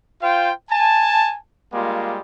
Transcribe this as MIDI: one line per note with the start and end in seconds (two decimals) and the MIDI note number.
0.22 0.51 65
0.22 0.51 72
0.22 0.51 77
0.22 0.51 79
0.70 1.36 80
0.70 1.36 81
1.73 2.21 55
1.73 2.21 56
1.73 2.21 58
1.73 2.21 65